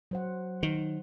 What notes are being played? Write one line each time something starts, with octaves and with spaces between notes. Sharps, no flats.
F#3 C5 F#5
D#3